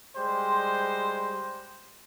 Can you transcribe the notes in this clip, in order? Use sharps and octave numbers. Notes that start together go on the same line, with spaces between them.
G3 G#3 C5